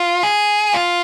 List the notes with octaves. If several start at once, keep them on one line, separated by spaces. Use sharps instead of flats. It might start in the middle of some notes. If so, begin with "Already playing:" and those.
Already playing: F4
G#4
F4